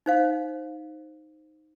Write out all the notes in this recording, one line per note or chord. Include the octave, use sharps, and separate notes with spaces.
D#4 C5 F5